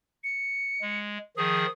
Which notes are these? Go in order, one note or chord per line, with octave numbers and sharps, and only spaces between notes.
C#7
G#3
D#3 F3 G#4 D#6